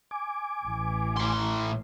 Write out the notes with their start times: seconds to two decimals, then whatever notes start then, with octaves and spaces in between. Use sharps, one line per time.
0.11 G#5 D6
0.66 A1 E3
1.17 A2 C6